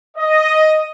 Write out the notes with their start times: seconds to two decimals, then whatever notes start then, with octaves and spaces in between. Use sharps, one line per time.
0.17 D#5